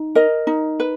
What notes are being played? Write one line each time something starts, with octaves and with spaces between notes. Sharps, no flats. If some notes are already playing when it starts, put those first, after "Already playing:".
Already playing: D#4
A#4 D#5
D#4
B4